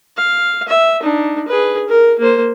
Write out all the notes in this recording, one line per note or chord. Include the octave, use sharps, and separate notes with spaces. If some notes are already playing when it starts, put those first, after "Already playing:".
F5
E5
D4 D#4
G#4 B4
A#4
A#3 C5